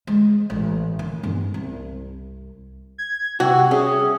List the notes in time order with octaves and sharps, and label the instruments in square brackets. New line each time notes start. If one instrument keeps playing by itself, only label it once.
[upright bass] G#3
A1
D#3
G2 B3
C2
[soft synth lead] G#6
[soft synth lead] C3 [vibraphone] G3 G5 E6 [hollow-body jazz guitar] F#4
[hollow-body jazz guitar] C#4 [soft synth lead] G#4 [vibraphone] E5 D#6